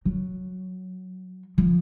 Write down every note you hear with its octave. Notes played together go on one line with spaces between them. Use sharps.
F#3
F3